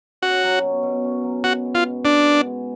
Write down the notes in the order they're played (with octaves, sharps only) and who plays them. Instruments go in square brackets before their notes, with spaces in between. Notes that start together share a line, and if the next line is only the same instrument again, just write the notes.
[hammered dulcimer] C#4 [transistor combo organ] F#4
[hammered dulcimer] F#3
B2
B2
C#4
F#3
[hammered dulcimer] B3 [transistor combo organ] F#4
[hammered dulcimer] G#3
[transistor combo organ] F4
[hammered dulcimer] G#2
[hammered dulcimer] G#2 [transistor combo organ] D4
[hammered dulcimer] B3
G#3